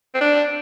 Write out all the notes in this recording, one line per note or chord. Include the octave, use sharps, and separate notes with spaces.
C4
D4